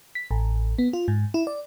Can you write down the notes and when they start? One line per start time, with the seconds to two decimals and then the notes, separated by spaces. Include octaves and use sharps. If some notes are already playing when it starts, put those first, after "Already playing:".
0.15 B6
0.31 A1
0.78 B3
0.93 F4
1.08 G#2
1.34 E4
1.47 D5